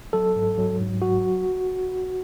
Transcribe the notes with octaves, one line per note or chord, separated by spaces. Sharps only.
F#3 A4
G#2
F#3
G#2
F#3 F#4